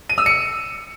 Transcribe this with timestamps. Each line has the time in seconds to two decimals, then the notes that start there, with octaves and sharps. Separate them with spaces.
0.09 D#7
0.18 E6
0.26 C#7